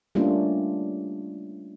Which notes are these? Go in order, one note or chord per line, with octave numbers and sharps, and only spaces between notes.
G3 A3 A#3 C#4 D4 F4